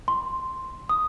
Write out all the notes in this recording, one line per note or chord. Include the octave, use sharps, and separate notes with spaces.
C6
D#6